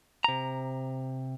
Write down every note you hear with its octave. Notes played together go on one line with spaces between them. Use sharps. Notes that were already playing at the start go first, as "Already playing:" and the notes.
C3 A#5